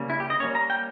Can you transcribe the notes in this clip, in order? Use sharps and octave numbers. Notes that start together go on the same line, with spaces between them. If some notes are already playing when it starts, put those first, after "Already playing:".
Already playing: C#3 G3 A#3
E4
G4
D#5
G3 A#3 C#4 C#5
A#5
G5